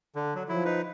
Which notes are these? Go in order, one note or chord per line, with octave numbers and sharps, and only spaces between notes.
D3
F#3
F3 F#3 E4
D#4 B4